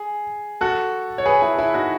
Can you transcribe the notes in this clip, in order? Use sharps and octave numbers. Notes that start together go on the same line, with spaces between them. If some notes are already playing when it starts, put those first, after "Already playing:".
Already playing: G#4
F#4 A4
C#5
G#4 B4
E4 G#4
E4
D#4 F#4